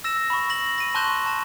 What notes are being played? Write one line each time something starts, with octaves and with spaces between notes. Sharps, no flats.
E6 A#6 E7
B5 C#6
A#6 F#7
A#6 D#7
A5 C6 C#6 F#6 G6 E7
A5 E7